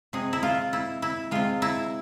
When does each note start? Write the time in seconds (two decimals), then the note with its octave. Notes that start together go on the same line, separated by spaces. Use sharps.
0.13 C3 G#3 G#4
0.33 E4
0.43 F4
0.73 E4
1.02 E4
1.31 C3 G#3 F4
1.62 E4